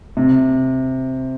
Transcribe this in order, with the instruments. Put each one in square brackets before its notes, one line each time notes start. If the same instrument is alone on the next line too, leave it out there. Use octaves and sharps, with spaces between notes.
[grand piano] C3